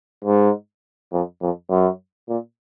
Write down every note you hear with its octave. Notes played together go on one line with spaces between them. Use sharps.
G#2
F2
F2
F#2
A#2